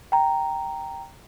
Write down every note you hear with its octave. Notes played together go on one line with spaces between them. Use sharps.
G5 A#5